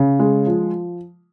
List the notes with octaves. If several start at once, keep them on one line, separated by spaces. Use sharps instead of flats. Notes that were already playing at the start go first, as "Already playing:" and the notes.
Already playing: C#3
G#3
F3